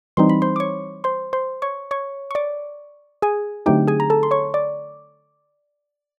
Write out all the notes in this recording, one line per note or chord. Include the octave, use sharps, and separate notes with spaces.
E3 G3 C4 D#4 C6
B5
C5 C6
D6
C#5 C#6
C5 C6
C5 C6
C#5 C#6
C#5 C#6
C#6
D5 D6
G#4 G#5
D3 F#3 A3 C4 D#4 G4 G5
G#4 G#5
A#5
A4 A5
C6
C#5 C#6
D5 D6